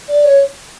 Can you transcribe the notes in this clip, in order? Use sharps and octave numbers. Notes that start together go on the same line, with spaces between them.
D5
C#5